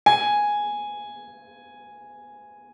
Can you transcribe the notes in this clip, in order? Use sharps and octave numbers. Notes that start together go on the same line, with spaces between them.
G#5